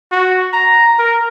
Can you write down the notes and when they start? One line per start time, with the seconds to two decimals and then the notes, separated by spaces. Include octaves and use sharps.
0.12 F#4
0.53 A#5
0.99 A#4